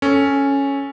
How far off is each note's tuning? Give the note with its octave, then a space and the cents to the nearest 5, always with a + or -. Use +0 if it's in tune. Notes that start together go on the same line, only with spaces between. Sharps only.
C#4 +0 A4 +0